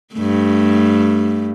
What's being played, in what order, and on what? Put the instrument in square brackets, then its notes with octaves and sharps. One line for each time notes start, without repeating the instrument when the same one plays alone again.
[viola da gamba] G2 A3